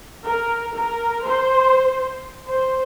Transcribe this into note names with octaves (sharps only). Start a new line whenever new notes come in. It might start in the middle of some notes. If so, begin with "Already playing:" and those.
A#4
A#4
C5
C5